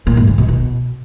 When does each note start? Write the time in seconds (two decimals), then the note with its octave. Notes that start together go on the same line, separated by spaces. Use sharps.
0.07 A#2
0.17 G#2
0.27 C#3
0.38 B2
0.48 B2